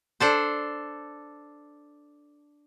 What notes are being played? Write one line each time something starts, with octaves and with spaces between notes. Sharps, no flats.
D4 A4 C5